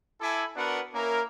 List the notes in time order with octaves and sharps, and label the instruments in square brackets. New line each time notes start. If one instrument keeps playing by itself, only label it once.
[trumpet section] E4 A4 E5 G#5 B5 D6
B3 D4 F#4 A#4 B4 F#5
A#3 C#4 E4 A#4